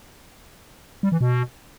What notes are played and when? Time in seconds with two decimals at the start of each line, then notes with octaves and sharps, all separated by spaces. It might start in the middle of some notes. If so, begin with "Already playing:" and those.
1.03 G3
1.12 E3
1.21 B2